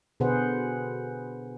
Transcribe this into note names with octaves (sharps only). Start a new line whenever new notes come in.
B2 D3 G#4 B4 C5 F#5